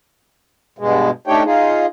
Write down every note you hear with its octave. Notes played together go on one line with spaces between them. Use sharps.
G2 B2 G#3
A3 D4 D#4 G4 C#5 G5
D#4 F4 G#4